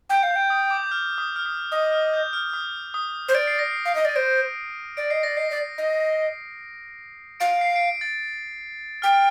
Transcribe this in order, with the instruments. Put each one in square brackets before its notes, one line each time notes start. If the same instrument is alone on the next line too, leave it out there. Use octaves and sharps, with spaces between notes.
[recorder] G5 [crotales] G6
[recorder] F5
[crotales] G6
[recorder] G5
[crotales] D#6
D6
G6
F6
D#6
F6
D#6
[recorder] D#5 [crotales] D#6
[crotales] F6
G6
F6
D#6
D#6
[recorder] C5
[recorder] D5 [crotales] D7
[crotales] C7
A#6
C7
[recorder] F5
D#5
[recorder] D5 [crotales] D#7
[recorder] C5 [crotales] D7
[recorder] D5 [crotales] D7
[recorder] D#5 [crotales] C7
[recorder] D5 [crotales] A#6
[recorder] D#5 [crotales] C7
[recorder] D5
D#5
[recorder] F5 [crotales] D7
[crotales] C7
D7
C7
A6
[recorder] G5 [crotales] F6